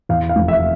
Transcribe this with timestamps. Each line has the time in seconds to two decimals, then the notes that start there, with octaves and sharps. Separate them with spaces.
0.09 E2 F5
0.29 F5
0.36 F1
0.48 E5